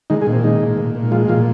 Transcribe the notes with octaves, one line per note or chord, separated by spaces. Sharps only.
D#3 G#3 D#4
G#3 G#4
A#2
C4
D#3 G#3 D#4
A#2
A#2
A#2
F3 G#3 F4
A#2 F3 F4